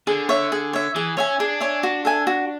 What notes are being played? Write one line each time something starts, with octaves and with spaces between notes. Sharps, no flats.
D3 G#4
C#5 E5
G#4
C#5 E5
E3 G#4
C#4 C#5 E5 G#5
D4 G#4
C#5 E5 G#5
F#4
A4 E5 G#5
F#4